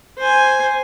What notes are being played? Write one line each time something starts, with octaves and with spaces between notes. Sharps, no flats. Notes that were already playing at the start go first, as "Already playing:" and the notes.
C5 G#5